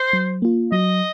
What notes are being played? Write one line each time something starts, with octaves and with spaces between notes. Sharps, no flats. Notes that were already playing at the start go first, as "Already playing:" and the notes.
Already playing: C5
F#3
A#3 F4
F#3 D#5